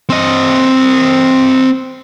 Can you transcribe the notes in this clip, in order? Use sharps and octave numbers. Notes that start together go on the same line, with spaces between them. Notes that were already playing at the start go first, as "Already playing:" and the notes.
C4 D#5